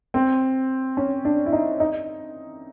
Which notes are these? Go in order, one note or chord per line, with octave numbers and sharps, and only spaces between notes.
C4
C#4
D4
E4
D#4
D#4